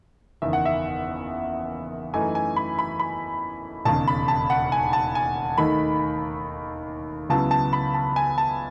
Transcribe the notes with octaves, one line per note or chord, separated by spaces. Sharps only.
F#1 E2 D#3 E5
F#5
E5
F#2 E3 A3 D#4 G#5
G#5
B5
B5
B5
E1 D#2 C#3 A5
B5
A5
F#5
G#5
A5
G#5
D#2 D#3 A3 D#4 B5
C#2 C#3 F#3 B3 E4 A5
A5
B5
A5
G#5
A5